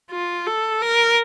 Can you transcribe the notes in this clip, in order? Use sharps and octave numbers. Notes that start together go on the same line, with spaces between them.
F4
A4
A#4